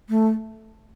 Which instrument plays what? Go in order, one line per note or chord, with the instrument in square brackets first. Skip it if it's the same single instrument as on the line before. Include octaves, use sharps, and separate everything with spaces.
[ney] A3